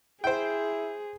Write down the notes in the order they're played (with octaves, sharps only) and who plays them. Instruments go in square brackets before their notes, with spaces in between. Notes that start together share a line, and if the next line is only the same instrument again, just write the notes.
[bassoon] E4 [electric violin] G#4 [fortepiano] C5 G5